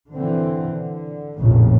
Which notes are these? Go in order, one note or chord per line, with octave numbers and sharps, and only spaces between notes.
D3 E3 C4
D3
F1 A#1 F2 A2 C#3